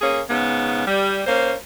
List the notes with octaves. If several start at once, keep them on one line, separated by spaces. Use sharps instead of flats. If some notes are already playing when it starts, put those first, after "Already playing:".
A#3 C#4 G#4
G#2 C#3 B3
G3
A#3 C#4 C5